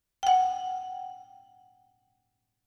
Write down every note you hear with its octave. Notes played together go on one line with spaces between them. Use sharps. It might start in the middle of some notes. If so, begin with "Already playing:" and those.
F#5 G5